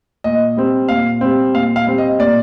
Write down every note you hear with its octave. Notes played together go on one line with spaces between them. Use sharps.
A#2 D#5
G3 C4
A#2 F5
G3 C4
A#2 F5
F5
G3 C4
D#5
A#2 D5